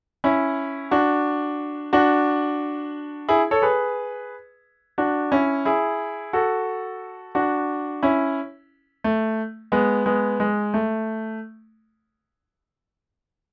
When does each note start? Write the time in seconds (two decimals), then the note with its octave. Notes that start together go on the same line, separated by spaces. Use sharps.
0.24 C#4 E4
0.91 D4 F#4
1.93 D4 F#4
3.28 E4 G#4
3.51 A4 C#5
3.62 G#4 B4
4.98 D4 F#4
5.32 C#4 E4
5.65 E4 G#4
6.33 F#4 A4
7.35 D4 F#4
8.03 C#4 E4
9.04 A3
9.72 G#3 B3
10.06 G#3 B3
10.40 G#3
10.74 A3